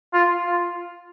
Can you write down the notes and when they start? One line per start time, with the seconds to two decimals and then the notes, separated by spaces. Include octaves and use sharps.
0.13 F4
0.46 F4